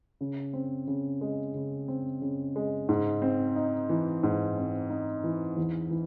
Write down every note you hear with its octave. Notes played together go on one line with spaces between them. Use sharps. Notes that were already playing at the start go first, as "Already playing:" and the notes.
C#3
C4
C#3
G#3
C#3
C4
C#3
G#3
G#2
C4
D#4
E3
G#2
C4
D#4
E3
E2
E3